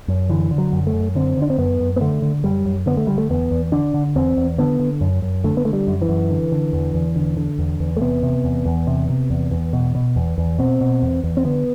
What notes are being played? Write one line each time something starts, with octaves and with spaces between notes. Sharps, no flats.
F#2
D3 E3
D3
F#3
F#2
A3
F#2
D3 C4
D3
D4
C4
F#2 B3
F#2
B3
D3 A3
D3
F#2 G3
F#2
D3 B3
A3
D3 G3
A3
E2 B3
E2
D3 D4
D3
E2 C4
E2
D3 B3
D3
F#2
F#2
D3 A3
B3
D3 A3
G3
F#2
E3
F#2
D3
D3
E2
E2
D3
D3
E2
E2
A3
C3 B3
C3
E2
E2
C3
C3
E2
E2
B2
B2
E2
E2
B2 C4
B2
E2
E2
C4
D3 B3